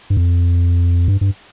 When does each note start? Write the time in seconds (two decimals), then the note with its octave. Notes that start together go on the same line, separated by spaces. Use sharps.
0.10 G2
0.17 F2
1.08 G2
1.21 G2